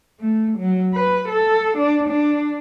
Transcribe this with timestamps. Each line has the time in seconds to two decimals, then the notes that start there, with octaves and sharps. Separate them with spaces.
0.20 A3
0.58 F#3
0.94 B4
1.29 A4
1.77 D4
2.08 D4